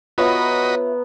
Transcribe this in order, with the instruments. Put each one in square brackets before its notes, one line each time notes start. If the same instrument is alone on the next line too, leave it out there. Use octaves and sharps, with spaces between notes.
[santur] B3 A#5 [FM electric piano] F4 C#5 E5 [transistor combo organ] F#4 D#5 B5